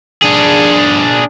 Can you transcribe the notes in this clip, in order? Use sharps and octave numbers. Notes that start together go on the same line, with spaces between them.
D4 G#4